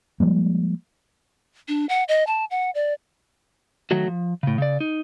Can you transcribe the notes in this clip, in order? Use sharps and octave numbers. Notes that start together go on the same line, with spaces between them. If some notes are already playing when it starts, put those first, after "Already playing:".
F3 G3 G#3 A#3
D4
F#5
D#5
A5
F#5
D5
D#3 F#3 A3 F#4
F3
A2 C#3
C#3 D5
D#4